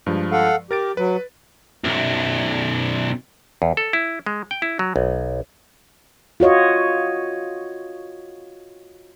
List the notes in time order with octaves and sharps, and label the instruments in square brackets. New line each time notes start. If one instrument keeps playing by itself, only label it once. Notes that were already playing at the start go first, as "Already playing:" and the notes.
[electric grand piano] G2 F3 G#3
[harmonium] A4 F5 F#5
[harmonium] G4 [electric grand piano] A#4 A6 D7
[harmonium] F#3 [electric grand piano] B4
[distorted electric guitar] B1 F#2
[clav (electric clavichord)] E2
A4
E4
G#3
G5
E4
F#3
B1
[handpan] F4 F#4 C#5 D#5